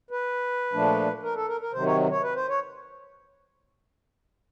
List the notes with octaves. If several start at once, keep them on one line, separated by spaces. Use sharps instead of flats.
B4
A#2 F3 A3 D4
A#4
A4
A#4
A#4
C3 D#3 F#3 C5
C#5
C#5
B4
C5
C#5